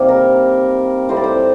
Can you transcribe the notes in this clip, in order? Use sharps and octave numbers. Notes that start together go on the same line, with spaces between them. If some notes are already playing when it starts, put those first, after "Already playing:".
Already playing: C3 D#3 G3 A#3
A#4
A2 G3 C4 C5
D5
C5